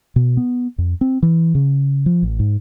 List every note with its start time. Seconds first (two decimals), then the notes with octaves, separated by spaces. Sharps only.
0.16 B2
0.37 B3
0.78 F2
1.01 C4
1.23 E3
1.55 C#3
2.06 F3
2.23 A1
2.39 G#2